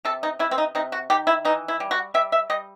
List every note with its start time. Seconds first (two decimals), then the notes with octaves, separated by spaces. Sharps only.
0.05 C3 A4
0.23 D#4
0.39 C3 E4
0.51 C4
0.58 D#4
0.75 C3 D#4
0.92 F#4
1.10 D#3 G4
1.27 E4
1.45 E3 D#4
1.68 E4
1.80 G3
1.91 F#4
2.14 G3 E5
2.32 E5
2.50 G3 D#5